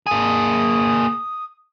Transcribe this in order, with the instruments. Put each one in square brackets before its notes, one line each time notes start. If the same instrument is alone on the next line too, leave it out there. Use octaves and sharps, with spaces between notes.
[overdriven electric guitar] A#3 G#4 [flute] D#6